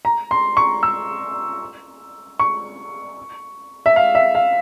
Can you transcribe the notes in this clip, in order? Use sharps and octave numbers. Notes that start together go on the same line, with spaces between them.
A#5
C6
C#6
E6
C#6
E5
F5
E5
F5